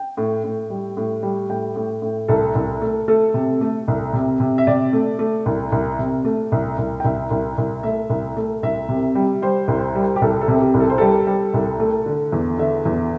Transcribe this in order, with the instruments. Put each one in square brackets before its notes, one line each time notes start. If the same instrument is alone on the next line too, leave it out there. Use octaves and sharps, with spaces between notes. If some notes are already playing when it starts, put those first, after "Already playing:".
Already playing: [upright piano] G5
A2
A2
G3
A2
G3
A2 G5
A2
A2
C2 A4
C2
A3
A3 A4
C3
A3
C2
C3
C3
E5
C3 D5
A3
A3
C2
C2
C3
A3
C2
C2
G5
C2 E5
C2
C2
A3 E5
C2
A3
C2 E5
C3
G3
G3 C5
C2
G3
G4
C2 A4
A4
C3
G4
C2
A4
C5
G3 A4
G3
C2
A3
D3
E2
D3 E5
E2